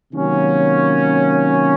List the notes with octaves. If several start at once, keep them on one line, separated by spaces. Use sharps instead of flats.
C3 D#3 F#3 A#3 C#4